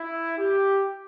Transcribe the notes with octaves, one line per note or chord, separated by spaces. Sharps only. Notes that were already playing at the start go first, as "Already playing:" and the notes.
Already playing: E4
G4